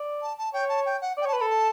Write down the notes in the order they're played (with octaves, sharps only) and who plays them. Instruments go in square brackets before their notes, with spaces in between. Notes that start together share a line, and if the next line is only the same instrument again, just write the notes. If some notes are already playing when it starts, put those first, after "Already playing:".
Already playing: [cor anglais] D5
[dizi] A5
A5
[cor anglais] C#5 [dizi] G5
[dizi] A5
G5
F#5
[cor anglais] D5
[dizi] G5
[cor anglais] C#5 [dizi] A5
[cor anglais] B4
[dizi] B5
[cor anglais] A4
[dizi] A5